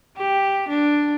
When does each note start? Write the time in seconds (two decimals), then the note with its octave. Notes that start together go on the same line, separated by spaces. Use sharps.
0.17 G4
0.69 D4